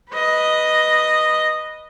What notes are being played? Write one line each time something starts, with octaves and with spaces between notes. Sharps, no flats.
B4 D#5